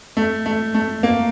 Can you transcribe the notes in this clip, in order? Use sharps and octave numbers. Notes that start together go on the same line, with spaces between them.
A3
A3
A3
A#3